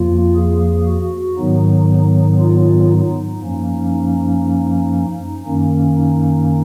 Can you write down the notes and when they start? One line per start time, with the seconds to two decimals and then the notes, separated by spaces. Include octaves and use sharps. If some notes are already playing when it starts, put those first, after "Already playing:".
Already playing: F2 F3 A#3 F4
0.36 G#4
0.87 F#4
1.37 G#2 D#3 F#3 B3 D#4
2.39 F4
2.90 D#4
3.42 F#2 F3 A#3 C#4
3.92 D#4
5.45 F#2 D#3 A#3 C#4
5.96 D#4